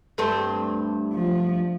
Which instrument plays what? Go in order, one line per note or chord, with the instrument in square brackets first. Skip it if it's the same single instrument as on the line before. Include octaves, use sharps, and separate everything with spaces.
[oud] G2 A3 C4
[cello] F3